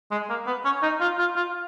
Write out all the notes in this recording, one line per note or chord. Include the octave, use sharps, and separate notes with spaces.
G#3
A#3
B3
C#4
D#4
F4
F4
F4